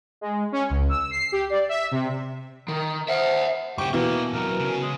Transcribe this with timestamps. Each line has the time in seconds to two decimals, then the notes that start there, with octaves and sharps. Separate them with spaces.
0.21 G#3
0.52 C#4
0.70 C#2
0.89 E6
1.11 C7
1.32 G4
1.50 D5
1.69 E5
1.92 C3
2.68 D#3
3.08 C5 E5 F#5
3.78 G2 C#3 G4 C#6
3.93 B2 E3 A#3 F#4 E5
4.34 C3 F#3 A#4
4.59 C#3 C#4
4.82 G#3